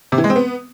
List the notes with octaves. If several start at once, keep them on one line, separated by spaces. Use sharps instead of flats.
C3
E3
G#3
C4
B3